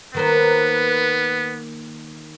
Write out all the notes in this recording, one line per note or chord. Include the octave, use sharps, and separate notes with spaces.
D#3 A#3 B3 B4 C5